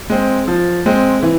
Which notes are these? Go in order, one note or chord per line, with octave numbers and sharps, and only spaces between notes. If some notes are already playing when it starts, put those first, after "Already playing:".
G#3 C4
F3
G#3 C4
E3